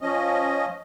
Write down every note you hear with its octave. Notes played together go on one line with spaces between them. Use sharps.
F3 C#4 D#5